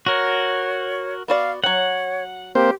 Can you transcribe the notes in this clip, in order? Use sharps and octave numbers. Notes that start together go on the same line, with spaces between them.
F#4 A#4 C#5
B3 F#4 D5 F5
F#3 C#5 F#5 G5
A#3 C4 G4 C5